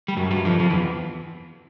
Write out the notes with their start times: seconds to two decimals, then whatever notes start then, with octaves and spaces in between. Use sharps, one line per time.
0.08 G3
0.17 F#2 F#3
0.31 G2 G3
0.45 F2 F3
0.59 F2 F3
0.70 E2 E3